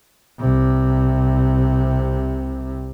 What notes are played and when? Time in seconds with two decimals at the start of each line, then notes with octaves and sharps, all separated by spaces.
0.39 C2 C3